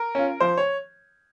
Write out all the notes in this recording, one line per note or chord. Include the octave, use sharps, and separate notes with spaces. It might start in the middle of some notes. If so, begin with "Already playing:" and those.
Already playing: A#4
C#4 F4
F3 C5
C#5